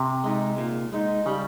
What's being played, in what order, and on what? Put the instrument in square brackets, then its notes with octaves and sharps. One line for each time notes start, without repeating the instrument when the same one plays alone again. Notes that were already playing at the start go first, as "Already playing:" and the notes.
Already playing: [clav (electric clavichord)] C3
[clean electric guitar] G#3 D#4
A#2
G#3 D#4
[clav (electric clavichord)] C#3 [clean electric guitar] G3